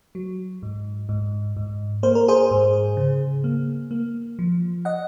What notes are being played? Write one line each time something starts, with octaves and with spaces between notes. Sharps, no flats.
F#3
G#2
G#2
G#2
A#3 C5
A#4
G#4 C5
G#2
C#3
A#3
A#3
F3
D#5 F#5